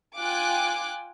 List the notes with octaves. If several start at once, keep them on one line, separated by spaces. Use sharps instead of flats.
F4 G5 G#5 D6 F#6